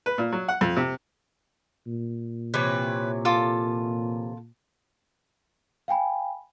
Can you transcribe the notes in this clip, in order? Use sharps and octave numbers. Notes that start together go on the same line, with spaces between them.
B4
A#2
F#3
F#5
F2
C3
A#2
C3 E3 B4 C#5
F4 A4 D6
F5 G5 G#5 B5